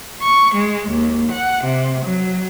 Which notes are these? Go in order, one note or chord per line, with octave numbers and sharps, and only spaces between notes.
C#6
G#3
D#2
F#5
C3
F#3